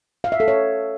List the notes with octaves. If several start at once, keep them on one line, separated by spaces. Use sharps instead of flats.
F5
E5
A4
C#5